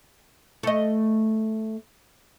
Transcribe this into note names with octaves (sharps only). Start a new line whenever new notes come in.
A3 D#5